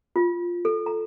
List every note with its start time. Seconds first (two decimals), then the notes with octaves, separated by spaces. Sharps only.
0.16 F4
0.65 A4
0.86 A#5